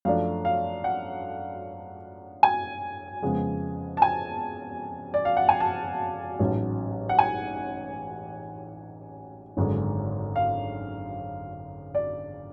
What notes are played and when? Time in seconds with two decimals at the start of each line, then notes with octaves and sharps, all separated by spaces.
0.05 F#2 F3 A3 D4 F5
0.45 F5
0.84 F#5
2.43 G#5
3.22 F2 C#3 G#3 B3
3.97 A5
4.02 G#5
5.14 D5
5.25 F5
5.37 F#5
5.49 G#5
5.60 A5
6.39 A1 G#2 F#3 C#4
7.09 F#5
7.19 G#5
9.57 G#1 F#2 D3 G#3
10.36 F5
11.95 D5